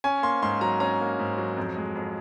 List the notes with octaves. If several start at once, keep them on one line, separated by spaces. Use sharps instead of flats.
C#4 G#5
A#3 C6
G#2 C6
F#3 A#5
C#4 A#5
A#3
G#2
F#3
F2
G#3
F2